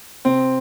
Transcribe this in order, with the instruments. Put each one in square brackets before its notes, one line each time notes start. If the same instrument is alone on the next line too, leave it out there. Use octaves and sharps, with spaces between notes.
[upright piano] C3 [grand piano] C4